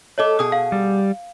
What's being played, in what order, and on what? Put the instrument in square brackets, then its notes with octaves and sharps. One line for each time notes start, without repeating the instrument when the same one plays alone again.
[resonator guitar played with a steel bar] A3 A4 [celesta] C#5 D#5 D6
[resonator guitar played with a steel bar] B2 G#4 [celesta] D#6
[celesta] F5
[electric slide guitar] G3